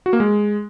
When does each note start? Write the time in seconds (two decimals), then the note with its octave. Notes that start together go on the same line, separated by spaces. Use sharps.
0.06 F#4
0.13 A#3
0.20 G#3